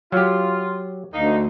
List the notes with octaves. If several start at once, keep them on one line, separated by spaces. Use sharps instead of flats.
F#3 F4 G4
D2 A#3 D#4